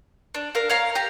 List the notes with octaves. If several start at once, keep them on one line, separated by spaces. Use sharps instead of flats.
D4
A#4 F5
C#5 F5 A#5
G4 A#5